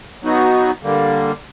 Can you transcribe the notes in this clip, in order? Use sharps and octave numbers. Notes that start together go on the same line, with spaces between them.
F#3 B3 D#4 F#4
D3 G3 A#3